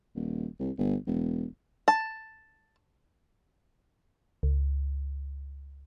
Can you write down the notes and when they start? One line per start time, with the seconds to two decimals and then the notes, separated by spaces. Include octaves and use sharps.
0.15 D#1
0.59 C2
0.77 G1
1.07 E1
1.88 A5
4.43 C#2